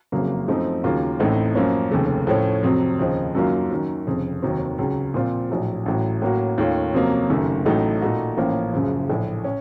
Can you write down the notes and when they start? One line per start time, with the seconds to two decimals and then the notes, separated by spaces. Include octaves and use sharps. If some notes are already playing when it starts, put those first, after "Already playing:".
0.12 F#1 F2 C#3 F#3 A#3
0.48 F#2 F3 A3 C4 D#4
0.84 D#2 C#3 F#3 A#3 F4
1.20 A1 A2 A3 C4 D#4
1.55 F#2 F3 A#3 C#4
1.91 F1 D#2 C#3 A3
2.27 A2 F3 A3 C#4
2.63 F2 C3 F#3
2.99 D#2 C#3 F3 C4 D#4
3.35 F#2 D#3 F#3 A#3 F4
3.71 F#2 D#3 F#3
4.07 F1 F2 C#3
4.42 F1 D#2 D#3 F#3 C4
4.78 C#2 C#3 F#3
5.14 A#2 F3 C4 F4
5.50 A#1 A2 F#3
5.86 A1 A2 F#3
6.22 A2 F#3 A#3 C#4 F#4
6.58 D#2 D#3 A3 C#4 F4
6.94 F2 C3 F#3 A#3 C#4
7.30 F#1 F#2 D#3 A3
7.65 A1 A2 F#3 A3 D#4
8.01 A#2 A3 D#4 F#4
8.37 A1 A2 F3 A#3 C#4
8.73 F#1 F#2 C#3 F3
9.09 A#1 A2 A3
9.44 C#4